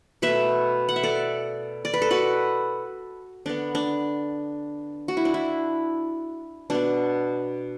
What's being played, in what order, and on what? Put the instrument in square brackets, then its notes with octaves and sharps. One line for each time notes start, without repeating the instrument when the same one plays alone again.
[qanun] B2 A3 B4 E5
F#5
E5
A4 D5
D5
B4
A4
F#4 B4
D3 B3 D4
D4
F#4
E4
D4
E4
B2 B3 D4